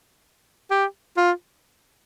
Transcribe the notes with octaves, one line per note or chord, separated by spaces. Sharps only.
G4
F4